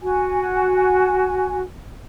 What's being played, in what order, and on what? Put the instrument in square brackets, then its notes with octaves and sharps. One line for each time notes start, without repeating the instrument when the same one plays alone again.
[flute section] F#4 G#5